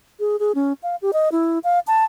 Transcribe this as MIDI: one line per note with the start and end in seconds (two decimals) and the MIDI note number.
0.20 0.36 68
0.40 0.52 68
0.55 0.73 61
0.83 0.96 77
1.02 1.11 67
1.13 1.29 75
1.32 1.59 64
1.64 1.79 77
1.87 2.04 81